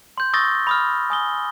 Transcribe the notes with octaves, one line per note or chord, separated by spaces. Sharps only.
C6 G6
C#6 D#6 E6 A6 A#6 G7
B5 D#6 F6
G#5 D#6 G7